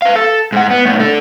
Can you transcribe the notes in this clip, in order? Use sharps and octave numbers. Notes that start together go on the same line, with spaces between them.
B4 F5
A4
G#2 F#5
B3
B2 A3
D3 A4